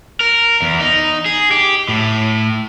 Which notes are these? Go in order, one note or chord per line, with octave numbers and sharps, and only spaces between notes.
A#4
E2
D#4
G#4
G4
A2